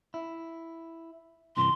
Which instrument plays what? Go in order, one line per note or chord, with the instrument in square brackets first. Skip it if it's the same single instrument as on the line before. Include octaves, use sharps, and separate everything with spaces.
[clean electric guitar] E4
[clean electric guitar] G2 C3 E3 [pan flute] C6